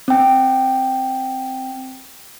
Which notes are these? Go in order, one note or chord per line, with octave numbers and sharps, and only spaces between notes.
C4 G5